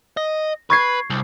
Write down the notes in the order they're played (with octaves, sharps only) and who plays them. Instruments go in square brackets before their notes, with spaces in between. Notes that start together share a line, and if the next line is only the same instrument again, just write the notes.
[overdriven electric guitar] D#5
[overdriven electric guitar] B4 [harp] C#6 G#6 C7
[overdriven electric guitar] C2